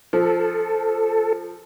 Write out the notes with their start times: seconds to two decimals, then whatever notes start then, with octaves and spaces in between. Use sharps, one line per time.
0.13 F3 A4